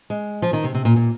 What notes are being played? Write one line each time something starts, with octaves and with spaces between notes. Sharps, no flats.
G#3
F3
D#3
C3
C3
A#2
A#2